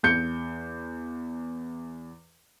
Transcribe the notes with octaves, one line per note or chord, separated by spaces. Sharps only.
E2 G6 C#7